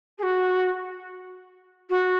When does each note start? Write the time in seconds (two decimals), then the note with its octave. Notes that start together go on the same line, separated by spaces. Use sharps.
0.18 G#4
0.22 F#4
1.89 F#4